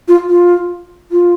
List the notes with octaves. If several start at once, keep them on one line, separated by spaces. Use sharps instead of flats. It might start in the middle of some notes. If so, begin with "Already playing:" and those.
F4
F4
F4